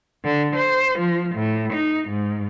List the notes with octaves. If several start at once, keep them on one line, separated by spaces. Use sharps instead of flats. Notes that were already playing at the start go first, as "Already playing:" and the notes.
D3
C5
F3
A2
D#4
G#2